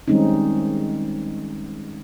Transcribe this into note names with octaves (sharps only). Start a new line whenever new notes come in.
D#3 G3 G#3 C4 C#4 D#4